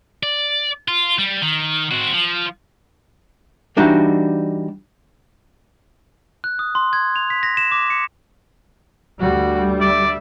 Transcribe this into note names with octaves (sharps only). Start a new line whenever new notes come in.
D5
F4
G3
D#3
C4 F#4
F3
E3 G3 D4 D#4 F#4
F#6
D#6
C6
G#6
F7
B6
A#6
E7
D6
C#7
D2 G3 F#4
D5 E5